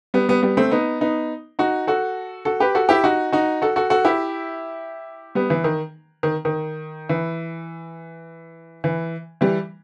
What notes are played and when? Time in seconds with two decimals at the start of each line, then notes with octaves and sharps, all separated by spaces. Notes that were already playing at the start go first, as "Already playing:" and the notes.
0.14 G3 B3
0.29 G3 B3
0.42 G3 B3
0.57 A3 C4
0.71 B3 D#4
1.01 B3 D#4
1.59 D#4 F#4
1.87 F#4 A4
2.45 F#4 A4
2.60 G4 B4
2.75 F#4 A4
2.89 E4 G4
3.04 D#4 F#4
3.32 D#4 F#4
3.62 F#4 A4
3.76 F#4 A4
3.90 F#4 A4
4.05 E4 G4
5.35 G3 B3
5.50 E3
5.64 D#3
6.23 D#3
6.45 D#3
7.09 E3
8.84 E3
9.41 E3 G3